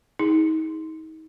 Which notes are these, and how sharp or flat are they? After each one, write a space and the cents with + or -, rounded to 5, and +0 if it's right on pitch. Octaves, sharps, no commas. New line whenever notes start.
D#4 +35 G#4 +0